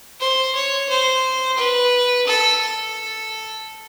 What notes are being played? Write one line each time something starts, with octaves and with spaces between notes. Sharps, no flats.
C5
C#5
C5
B4
A4
A4